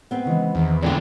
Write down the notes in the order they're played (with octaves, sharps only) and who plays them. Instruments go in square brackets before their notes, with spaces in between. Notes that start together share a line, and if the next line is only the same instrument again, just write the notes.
[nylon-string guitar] B3 C4
[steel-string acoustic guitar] C#3 E3 G#3
[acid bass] E2 [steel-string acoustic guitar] D#3
[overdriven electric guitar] F2 D3 [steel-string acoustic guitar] A#2 G5 [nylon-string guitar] D4 E4 D5